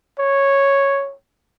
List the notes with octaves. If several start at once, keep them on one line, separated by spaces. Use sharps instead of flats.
C#5